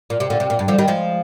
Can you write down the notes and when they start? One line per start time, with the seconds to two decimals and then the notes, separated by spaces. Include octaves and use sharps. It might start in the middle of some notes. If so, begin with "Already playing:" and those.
0.10 A#2
0.20 C3
0.30 A#2 D3
0.40 C3
0.50 A#2
0.59 G2
0.68 D3 F3
0.78 D#3 G3
0.88 F3 G#3